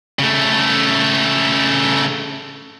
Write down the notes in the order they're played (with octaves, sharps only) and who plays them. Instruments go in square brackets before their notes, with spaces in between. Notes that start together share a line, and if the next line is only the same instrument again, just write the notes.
[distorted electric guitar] C#3 A3